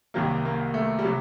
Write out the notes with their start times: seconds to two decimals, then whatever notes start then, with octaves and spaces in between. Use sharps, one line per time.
0.14 C2 C3 D#3 F#3 A#3
0.45 A#3
0.74 A3
0.99 G3
1.05 C3 F#3